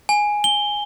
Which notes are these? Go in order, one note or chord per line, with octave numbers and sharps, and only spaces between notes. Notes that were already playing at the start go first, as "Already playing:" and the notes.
G#5
G7